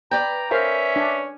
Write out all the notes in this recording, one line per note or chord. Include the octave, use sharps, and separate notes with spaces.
B4 D5 G5 A#5
C#4 A#4 C5 E5 F5
D4